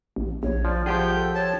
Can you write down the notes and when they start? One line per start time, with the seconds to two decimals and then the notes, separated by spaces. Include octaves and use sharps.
0.16 A1
0.43 A#1 C#5
0.65 F3 D5
0.86 F3 G4 G#4 F#5 G5
1.15 A4
1.35 C#5 A5